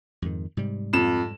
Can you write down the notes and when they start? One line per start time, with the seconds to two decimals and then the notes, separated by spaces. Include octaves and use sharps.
0.22 F2 G#2 D#3
0.57 G#2 C3 G3
0.93 F2 E7